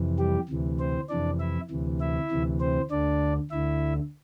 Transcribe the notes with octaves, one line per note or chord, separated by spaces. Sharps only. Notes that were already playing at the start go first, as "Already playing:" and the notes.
Already playing: F2 C3 E3
G3 G4
D2 C3 E3
C4 C5
F2 C3 E3 D4 D5
E4 E5
D2 C3 E3
E4 E5
D2 C3 E3
C4 C5
D2 D3 D4 D5
D2 D3 E4 E5